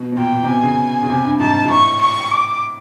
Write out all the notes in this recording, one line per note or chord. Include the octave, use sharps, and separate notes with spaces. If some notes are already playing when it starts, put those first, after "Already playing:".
Already playing: B2
B2
A#2 G5
A#2
C3
B2 G#5
C#3
C#3
C3
G2
G#2 A5
G#2
A2 C#6
C#6
D6